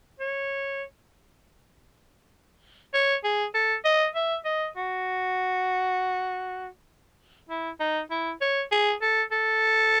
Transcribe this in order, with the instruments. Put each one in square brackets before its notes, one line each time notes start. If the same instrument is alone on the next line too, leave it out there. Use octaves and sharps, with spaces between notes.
[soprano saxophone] C#5
C#5
G#4
A4
D#5
E5
D#5
F#4
E4
D#4
E4
C#5
G#4
A4
A4